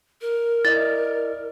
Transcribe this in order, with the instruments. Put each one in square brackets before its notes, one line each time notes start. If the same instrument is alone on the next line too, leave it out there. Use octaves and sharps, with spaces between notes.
[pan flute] A#4
[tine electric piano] E4 D5 D#5 [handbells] A6